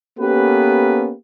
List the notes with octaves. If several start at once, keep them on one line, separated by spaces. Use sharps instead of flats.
A#3 B3 C#4 G4 A4 B4